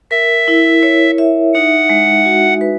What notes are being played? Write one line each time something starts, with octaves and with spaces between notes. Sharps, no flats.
A#4 E5
E4
C#5
E5
D#4 F#5
G#3
F#4
B4